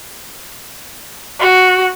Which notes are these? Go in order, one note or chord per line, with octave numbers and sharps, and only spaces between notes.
F#4